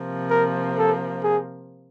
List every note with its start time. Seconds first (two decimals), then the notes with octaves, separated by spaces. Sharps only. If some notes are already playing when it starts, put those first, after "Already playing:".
Already playing: C3 F3 A#3
0.30 A#4
0.78 A4
1.23 G#4